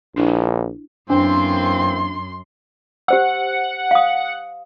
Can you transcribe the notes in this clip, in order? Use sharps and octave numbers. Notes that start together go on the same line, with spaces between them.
A#1 D4 E4
F#2 E3 A#3 C4 D4 C6
G4 C5 F#5 E6
F5 D#6